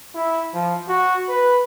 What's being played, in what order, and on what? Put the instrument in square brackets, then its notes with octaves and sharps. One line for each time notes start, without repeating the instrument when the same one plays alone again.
[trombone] E4
F3
F#4
B4